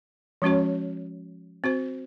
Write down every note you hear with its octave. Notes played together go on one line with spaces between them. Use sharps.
F3 G#3 C#4 F#4 C#5
C4 F#4 C5